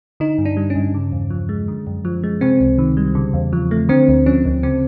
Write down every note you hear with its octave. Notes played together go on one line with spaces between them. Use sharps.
D3 D#4
G2
D4
G3
C#4
G2
C#3
E2
F3
G#3
D3
F#2
F3
G#3
C3 C4
C#2
D#3
G3
C#3
E2
F3
A3
D3 C4
D2
F3 C#4
D2
C#3 C4